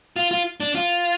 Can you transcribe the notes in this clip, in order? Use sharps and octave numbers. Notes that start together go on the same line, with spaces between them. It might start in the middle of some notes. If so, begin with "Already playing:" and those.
F4
F4
D4
F4